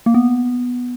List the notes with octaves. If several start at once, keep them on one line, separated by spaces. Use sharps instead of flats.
A#3
B3